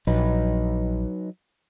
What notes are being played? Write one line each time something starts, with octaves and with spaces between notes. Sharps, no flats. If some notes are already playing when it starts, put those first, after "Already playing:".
A#1 F#3 D#4 B4